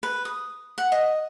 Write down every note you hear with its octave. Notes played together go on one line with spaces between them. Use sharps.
B4
D#6
F#5
D#5